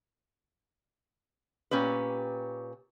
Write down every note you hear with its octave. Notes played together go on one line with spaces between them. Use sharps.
A#2 C#4 G4 B4